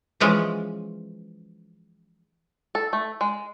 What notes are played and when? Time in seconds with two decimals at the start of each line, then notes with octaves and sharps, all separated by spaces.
0.20 E3 F3 G#3 C#4
2.75 A4
2.93 A3
3.21 G#3